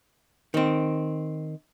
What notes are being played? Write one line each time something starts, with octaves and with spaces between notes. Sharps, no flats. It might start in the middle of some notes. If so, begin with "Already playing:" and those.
D#3 C4